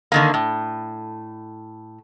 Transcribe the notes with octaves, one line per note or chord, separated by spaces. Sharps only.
D3 D#3 A#3
A2